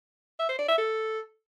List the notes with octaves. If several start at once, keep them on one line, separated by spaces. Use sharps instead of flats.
E5
C5
D5
E5
A4